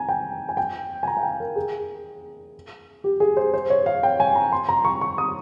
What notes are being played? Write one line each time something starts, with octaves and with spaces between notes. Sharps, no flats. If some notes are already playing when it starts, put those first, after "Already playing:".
Already playing: G#5 A#5
G5
G#5
G5
G#5
A#5
F5
G5
A#4
G#4
G4
G#4
C5
C5
C#5
F5
G5
G#5
A#5
C6
A#5
C#6
C#6
D#6